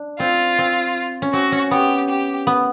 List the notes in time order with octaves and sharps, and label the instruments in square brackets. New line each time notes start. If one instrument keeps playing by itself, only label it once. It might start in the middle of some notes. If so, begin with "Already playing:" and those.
Already playing: [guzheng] D4
[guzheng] C4 [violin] F4
[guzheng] C4
C#4
[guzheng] C4 [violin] F#4
[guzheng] C#4
[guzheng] B3 [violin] G4
[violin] G4
[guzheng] B3